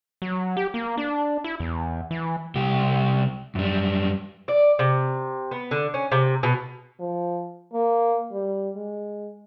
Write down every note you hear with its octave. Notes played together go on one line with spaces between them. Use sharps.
F#3
G4
A#3
D4
E4
E2
E3
C2 G4
F#2 G3
D5
C3
B3
D3
C#4
C3
B2
F3
A#3
G3
G#3